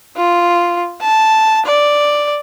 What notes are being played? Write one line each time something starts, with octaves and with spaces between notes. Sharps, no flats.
F4
A5
D5